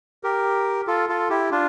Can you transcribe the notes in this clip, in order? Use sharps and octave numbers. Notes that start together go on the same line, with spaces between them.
G4 A#4
F4 A4
F4 A4
E4 G4
D4 F4